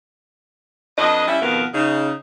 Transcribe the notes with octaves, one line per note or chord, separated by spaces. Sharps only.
F2 D4 B4 D#5
G3 C#4 E4 E5
F2 B2 D#3 B3 A#4 F5
C#3 D#4